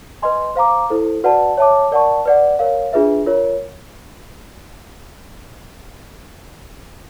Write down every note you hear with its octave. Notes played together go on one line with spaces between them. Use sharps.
B4 D#5 G#5 C6
C5 F5 A#5 D6
E4 A4 C5
F#4 B4 D5 F#5 A5
C#5 E5 A5 D6
A#4 D5 F#5 A5 C#6
B4 D5 F#5
A#4 C#5 F5
D4 F4 G#4 B4 E5
F4 A#4 C#5